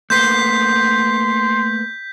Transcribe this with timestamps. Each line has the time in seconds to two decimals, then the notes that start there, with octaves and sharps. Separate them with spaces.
0.10 A3 A#3 B4 C6 G6 B6